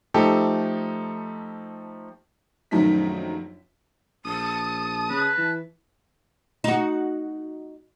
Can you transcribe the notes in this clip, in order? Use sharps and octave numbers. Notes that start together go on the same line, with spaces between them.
F3 A3 D#4 G4 A4
A#1 F#2 D#3 A3 D#4 B6
A#1 A5 D#6
C#3 B4
E3
D#4 F#4